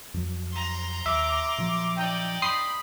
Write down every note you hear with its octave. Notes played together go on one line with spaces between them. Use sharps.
F2 F#3
A#5 C6
D#2 E5 D6
A#2 F3 F#3
D#4 D5 G5
B5 C6 D#6 C7